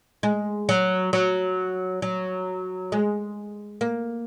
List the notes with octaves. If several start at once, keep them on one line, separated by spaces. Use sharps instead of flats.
G#3
F#3
F#3
F#3
G#3
A#3